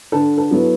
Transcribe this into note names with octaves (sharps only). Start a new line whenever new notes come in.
D3 A4
A4
F#3 B3 E4